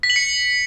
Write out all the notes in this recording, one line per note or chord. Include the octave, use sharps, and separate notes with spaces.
B6
F#7
C#7